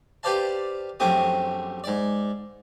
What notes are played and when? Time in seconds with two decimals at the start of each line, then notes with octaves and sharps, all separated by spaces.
0.23 G4 B4 C5 D5 F5 A5
1.00 A#1 F#2 A3 C4 G4 D#6
1.84 G#2 D5